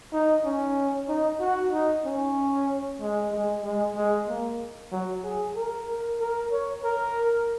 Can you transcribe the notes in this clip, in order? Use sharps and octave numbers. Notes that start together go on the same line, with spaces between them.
D#4
C#4
D#4
F#4
D#4
C#4
G#3
G#3
G#3
G#3
A#3
F#3
G#4
A#4
A#4
C#5
A#4